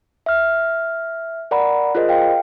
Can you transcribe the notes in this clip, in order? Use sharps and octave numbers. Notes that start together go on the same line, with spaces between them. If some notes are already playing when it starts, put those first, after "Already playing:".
E5 F6
A#4 D5 F#5 A#5 B5
F4 G#4 A#4 C5 D#5
F5 G5